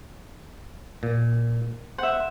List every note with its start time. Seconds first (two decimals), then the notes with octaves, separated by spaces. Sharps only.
1.03 A#2
1.98 C5 E5 F#5